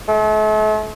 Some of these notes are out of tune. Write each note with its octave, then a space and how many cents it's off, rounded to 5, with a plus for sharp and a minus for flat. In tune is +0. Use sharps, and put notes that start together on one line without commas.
A3 -40